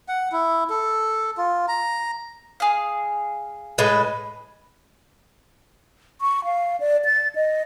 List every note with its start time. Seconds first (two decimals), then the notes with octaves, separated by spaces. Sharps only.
0.08 F#5
0.32 E4
0.70 A4
1.37 F4
1.68 A#5
2.60 G#4 F5
3.78 A2 G#3 B4
6.21 C#6
6.45 F5
6.80 D5
7.05 A6
7.35 D#5